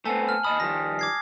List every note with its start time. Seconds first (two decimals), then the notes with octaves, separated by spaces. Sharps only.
0.05 A3 B3 C4 G#5 A5
0.29 F6
0.44 D#2 D#5 B5 D#6
0.60 D#3 F3 G3 A#6
0.99 D6 G#6 C7